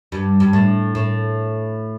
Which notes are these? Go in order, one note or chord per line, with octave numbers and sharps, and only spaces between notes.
G2
G2
A2
A2